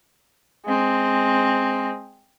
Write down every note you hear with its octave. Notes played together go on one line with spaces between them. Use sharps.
G#3 C4